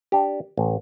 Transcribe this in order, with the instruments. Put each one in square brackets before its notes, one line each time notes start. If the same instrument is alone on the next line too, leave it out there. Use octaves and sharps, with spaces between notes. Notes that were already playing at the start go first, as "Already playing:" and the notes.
[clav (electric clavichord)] D4 G4
A1